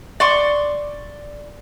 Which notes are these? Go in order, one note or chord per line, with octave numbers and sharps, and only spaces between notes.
D5 C6 C#6